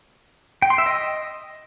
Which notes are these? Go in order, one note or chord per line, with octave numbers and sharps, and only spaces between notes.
G5
C6
E5
D#5